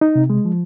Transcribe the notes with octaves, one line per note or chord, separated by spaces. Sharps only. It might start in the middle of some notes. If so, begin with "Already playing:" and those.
D#4
C3
G#3
F3